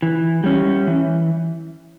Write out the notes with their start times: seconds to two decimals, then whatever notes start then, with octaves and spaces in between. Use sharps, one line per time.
0.02 E3
0.44 G3 C#4
0.87 E3